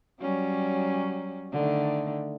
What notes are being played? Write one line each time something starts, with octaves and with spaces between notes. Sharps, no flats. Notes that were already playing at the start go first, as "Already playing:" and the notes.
F#3 G3 C#4
D3 D#3 A3